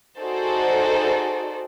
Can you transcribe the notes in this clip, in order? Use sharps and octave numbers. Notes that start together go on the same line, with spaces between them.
D#4 F#4 G#4 A4 C5 D5